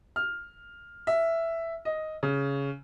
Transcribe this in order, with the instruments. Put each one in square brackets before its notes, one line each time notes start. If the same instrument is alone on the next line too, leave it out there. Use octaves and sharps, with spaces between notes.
[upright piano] F6
E5
D#5
C#3